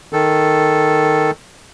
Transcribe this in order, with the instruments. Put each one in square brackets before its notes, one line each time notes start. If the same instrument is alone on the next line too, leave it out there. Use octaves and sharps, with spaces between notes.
[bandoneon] D#3 A4